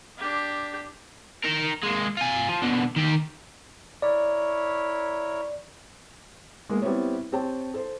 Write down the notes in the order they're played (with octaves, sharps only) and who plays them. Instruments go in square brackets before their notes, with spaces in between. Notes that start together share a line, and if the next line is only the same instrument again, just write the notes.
[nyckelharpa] D4 G4
[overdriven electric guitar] D#4 A#4
G#3 A#3
F4 G#5
F3
B2 D3
D#3 G4
[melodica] E4 A#4 C#5 [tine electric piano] D5
[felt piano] G#3 A#3 B3
G3 B3 C4 E4 B4 C#5
C4 G4 C#5 G5 A5
A4 C5